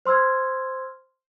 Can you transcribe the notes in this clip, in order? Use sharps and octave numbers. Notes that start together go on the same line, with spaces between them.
C5 C6 E6 F6 G#6